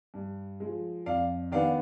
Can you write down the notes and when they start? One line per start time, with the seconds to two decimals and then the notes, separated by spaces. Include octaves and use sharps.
0.14 G2
0.60 F3 G#3
1.06 F2 D5 F5
1.52 D#3 B3 D4 D5 F5